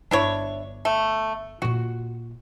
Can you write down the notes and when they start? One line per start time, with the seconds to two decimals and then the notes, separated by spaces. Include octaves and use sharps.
0.11 G1 D4 E4 C#5
0.85 A3
1.62 A#2 F4 F#4